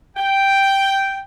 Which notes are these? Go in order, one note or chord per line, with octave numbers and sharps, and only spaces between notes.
G5